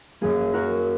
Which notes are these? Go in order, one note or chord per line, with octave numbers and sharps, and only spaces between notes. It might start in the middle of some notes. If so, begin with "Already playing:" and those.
F#2 F#3 A#3 G#4
F#4 A#4